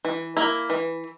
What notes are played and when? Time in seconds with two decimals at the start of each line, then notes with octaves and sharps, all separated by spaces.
0.05 E3
0.37 A#3 E4
0.70 E3